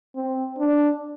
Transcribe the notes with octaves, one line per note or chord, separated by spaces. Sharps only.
C4
D4